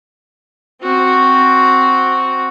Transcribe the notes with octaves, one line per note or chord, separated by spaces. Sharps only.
C4 F#4